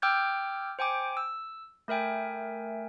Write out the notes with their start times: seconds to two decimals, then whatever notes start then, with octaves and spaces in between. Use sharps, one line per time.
0.02 G5 D6 E6 F6 G6 G#6
0.79 C5 G5 G#5 D6
1.17 E6
1.88 A3 A#4 E5 G5 G#5